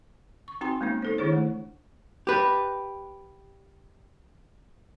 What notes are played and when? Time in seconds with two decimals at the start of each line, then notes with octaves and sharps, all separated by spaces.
0.48 C#6
0.61 C4 D#4 F#4 G5 A#5 C6
0.81 G#3 A#3 B3 C#4 D#4
1.02 D#4 A4 C5
1.18 D#3 D4 E4 G#4 C#5
1.33 A3
2.27 G4 B4